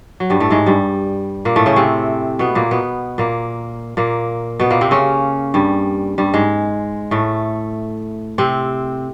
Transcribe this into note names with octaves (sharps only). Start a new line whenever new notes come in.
F#3
G2 G3
A2 A3
G#2 G#3
G2 G3
A#2 A#3
A2 A3
C#3 C#4
C3 C4
B2 B3
A#2 A#3
B2 B3
A#2 A#3
A#2 A#3
B2 B3
A#2 A#3
C3 C4
C#3 C#4
G2 G3
G2 G3
G#2 G#3
A2 A3
C3 C4